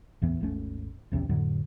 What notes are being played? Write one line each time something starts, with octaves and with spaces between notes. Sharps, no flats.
A1 E2 E3 B3
G#1 D#2 A3 C#4
A#1 E2 C3 C#4
F2 A2 D3 F#3